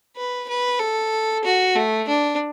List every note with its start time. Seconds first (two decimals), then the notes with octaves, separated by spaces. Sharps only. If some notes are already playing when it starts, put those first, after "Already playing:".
0.16 B4
0.48 B4
0.79 A4
1.44 F#4
1.75 A3
2.08 D4